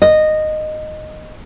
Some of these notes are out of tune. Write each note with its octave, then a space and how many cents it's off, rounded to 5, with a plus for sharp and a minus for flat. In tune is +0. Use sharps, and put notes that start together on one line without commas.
D#5 -10